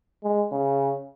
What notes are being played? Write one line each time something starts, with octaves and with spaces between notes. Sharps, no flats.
G#3
C#3